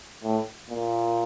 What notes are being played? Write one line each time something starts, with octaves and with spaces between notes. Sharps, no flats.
A2
A#2